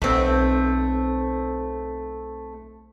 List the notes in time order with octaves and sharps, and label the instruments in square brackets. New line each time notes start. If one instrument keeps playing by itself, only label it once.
[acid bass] B1 [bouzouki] A3 C4